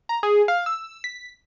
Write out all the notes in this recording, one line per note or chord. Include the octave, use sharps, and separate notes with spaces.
A#5
G#4
F5
E6
B6